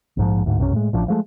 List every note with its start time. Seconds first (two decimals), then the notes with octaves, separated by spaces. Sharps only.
0.17 A#1 G#2 F3
0.46 D2 G#2
0.59 B1 F#2 C3 C#4
0.73 A2 G#3
0.93 A1 F3 D4
1.08 F3 G#3 A3